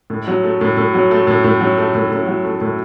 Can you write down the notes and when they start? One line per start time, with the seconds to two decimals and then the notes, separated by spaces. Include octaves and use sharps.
0.10 A2
0.27 F#3
0.44 A3
0.61 A2
0.77 A2
0.94 F#3
1.11 A3
1.27 A2
1.44 A2
1.61 F#3
1.77 A3
1.95 A2
2.12 A2
2.27 F#3
2.45 A3
2.61 A2